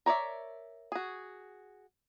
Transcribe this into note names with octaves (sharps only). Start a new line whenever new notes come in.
A#4 C#5 D5 E5
F#4 G#4